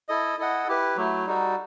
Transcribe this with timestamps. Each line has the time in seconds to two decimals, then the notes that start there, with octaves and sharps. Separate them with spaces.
0.09 E4 A4 D#5
0.38 E4 A4 D#5 F#5
0.68 E4 G4 B4
0.96 F#3 A3 E4
1.27 G3 D#4 F#4 A4